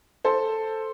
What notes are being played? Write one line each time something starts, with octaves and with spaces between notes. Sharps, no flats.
A4 C5